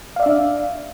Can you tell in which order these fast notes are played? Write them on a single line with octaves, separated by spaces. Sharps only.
F5 D5 E5 D4